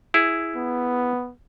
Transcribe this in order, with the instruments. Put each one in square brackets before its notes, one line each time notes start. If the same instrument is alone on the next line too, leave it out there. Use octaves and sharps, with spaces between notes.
[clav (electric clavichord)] E4 G#4
[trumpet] B3